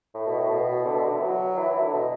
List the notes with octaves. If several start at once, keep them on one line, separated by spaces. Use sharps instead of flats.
A2
B2
A2
B2
D3
B2
D3
E3
F#3
E3
E3
D3
B2